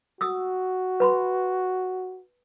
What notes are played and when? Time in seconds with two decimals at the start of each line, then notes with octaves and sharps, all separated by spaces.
0.21 F#4 D#6 E6
1.00 B4 B5 C6